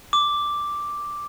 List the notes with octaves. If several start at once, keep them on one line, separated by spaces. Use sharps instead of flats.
D6